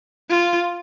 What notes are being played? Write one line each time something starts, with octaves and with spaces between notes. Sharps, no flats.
F4